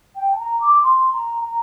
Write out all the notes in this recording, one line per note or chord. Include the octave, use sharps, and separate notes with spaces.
G5
A5
A#5
D6
C6
A#5
A#5